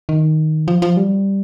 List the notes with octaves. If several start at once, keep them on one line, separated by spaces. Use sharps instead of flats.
D#3
F3
F3
G3